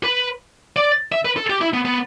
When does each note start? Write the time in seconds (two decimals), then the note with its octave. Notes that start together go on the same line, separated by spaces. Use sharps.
0.04 B4
0.76 D5
1.12 E5
1.25 B4
1.37 A4
1.50 G4
1.61 E4
1.74 B3
1.85 B3